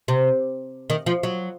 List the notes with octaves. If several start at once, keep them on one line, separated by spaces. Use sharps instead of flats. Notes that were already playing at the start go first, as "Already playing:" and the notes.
C3
D#3
F3
F#3